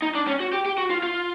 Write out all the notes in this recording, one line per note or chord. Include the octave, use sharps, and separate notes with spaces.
D#4
D4
C#4
F#4
G4
G4
F#4
F4
F4